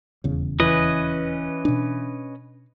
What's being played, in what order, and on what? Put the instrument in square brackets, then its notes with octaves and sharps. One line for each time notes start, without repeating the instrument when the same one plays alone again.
[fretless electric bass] D#1 E2 C#3
[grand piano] E3 [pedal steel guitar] C#4 B4 D#5
[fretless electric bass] B2 D4